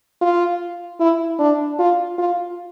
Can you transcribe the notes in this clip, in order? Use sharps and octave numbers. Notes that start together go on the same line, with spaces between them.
F4
E4
D4
F4
F4